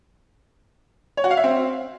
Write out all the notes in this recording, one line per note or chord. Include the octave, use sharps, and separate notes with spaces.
C#5
F#4
F5
E5
C4